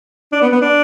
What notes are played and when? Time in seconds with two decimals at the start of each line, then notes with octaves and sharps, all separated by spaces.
0.32 D4
0.42 B3
0.52 B3
0.62 D4